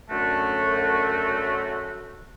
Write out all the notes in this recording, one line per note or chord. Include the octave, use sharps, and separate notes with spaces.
F#2 D3 A3 F#4